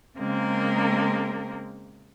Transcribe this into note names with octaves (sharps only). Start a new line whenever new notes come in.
C#3 G#3 A#3 C4 A#4